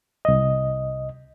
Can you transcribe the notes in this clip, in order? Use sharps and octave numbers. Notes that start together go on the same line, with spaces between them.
C2 D#5